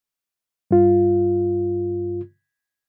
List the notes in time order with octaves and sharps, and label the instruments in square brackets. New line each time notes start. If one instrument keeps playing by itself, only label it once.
[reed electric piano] G2 F4